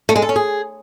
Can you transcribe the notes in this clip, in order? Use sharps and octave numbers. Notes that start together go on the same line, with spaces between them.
A3
G#3
A4
C#4
G#4